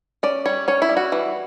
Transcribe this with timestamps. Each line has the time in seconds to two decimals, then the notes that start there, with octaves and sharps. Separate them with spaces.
0.23 C#4 D5
0.46 G3 C#5
0.68 C#4 C#5
0.82 E4
0.89 G3
0.97 F#4
1.12 E3